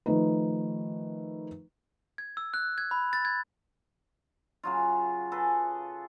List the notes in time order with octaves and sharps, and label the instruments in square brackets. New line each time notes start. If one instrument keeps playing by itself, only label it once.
[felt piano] D#3 F3 A3 D#4 B4
[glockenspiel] G#6
E6
F#6
G#6
B5
A6
G#6
[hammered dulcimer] C#3 F#3 F4
G#4 A4 B4